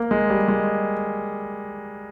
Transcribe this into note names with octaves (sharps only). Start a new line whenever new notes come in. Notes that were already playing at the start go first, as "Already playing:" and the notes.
Already playing: A#3
G#3
G3
G#3